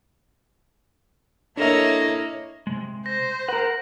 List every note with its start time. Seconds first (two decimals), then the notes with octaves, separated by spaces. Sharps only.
1.57 A#3 D4 E4 A4 C#5 D#5 E5
2.67 C3 G#3
3.06 C5 A#6
3.49 A#4 B4 F#5